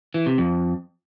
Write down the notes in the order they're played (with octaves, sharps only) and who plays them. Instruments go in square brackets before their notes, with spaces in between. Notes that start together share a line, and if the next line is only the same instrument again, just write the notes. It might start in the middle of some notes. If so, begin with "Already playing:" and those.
[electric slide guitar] E3
C3
F2